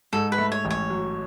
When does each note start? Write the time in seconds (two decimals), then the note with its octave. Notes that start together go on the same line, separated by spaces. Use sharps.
0.13 G#2 A4
0.32 B4
0.38 A3
0.52 C#5
0.65 A1
0.70 C#5
0.90 F#3